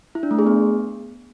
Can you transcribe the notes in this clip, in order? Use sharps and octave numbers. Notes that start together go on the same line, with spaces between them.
E4
D4
A3
G#4
B3